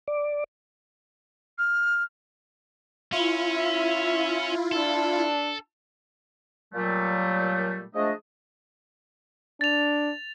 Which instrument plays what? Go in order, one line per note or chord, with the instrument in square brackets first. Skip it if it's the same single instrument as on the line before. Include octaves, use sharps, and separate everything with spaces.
[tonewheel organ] D5
[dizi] F6
[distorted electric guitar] C#4 [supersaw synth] E4 F4
[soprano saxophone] E5
[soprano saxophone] D4 [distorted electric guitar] A4
[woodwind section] A#2 F#3 G3 A3
F3 G#3 A3 D4 D#5
[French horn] D4 [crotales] A6 F7